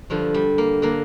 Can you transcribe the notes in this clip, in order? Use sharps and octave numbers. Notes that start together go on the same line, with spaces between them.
G2 D3 F3
G3
A#3
D3 A#3